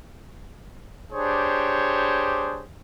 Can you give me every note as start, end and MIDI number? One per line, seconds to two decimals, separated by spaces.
1.13 2.64 62
1.13 2.64 67
1.13 2.64 68
1.13 2.64 72
1.13 2.64 73